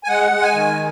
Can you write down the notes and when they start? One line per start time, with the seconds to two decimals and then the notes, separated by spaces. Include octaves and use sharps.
0.04 G#5
0.08 G#3 F#5
0.31 G#3
0.43 G#5
0.54 D#3